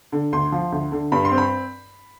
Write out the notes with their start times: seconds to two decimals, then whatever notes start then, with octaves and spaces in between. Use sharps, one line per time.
0.12 D3
0.32 D2 C6
0.52 F3
0.72 D2
0.92 D3
1.12 G2 B5
1.25 C6
1.31 C4
1.38 B5